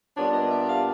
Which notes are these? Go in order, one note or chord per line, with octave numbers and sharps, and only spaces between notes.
A#2 G3 B3 D4 C#5
D#5
E5
E5
F5